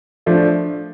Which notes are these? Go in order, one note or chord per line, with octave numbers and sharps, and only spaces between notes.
F3 A3 D4